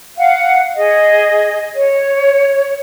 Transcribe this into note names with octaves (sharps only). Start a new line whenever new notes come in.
F5 F#5
G#4 D#5
C#5